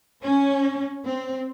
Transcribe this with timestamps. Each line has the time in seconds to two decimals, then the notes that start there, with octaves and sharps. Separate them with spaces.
0.24 C#4
1.04 C4